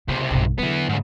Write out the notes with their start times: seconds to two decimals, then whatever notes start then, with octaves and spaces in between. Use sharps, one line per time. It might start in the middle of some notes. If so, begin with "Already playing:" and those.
0.08 C#2 C3 B3
0.31 B1 G2
0.59 D3 E3 F#3 B3
0.89 G#2 C#3